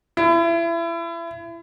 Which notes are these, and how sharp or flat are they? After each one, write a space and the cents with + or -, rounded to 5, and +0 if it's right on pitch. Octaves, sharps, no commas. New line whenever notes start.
E4 +30